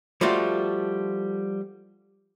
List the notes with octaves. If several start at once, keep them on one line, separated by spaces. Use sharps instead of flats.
F3 G3 A3 F4 F#4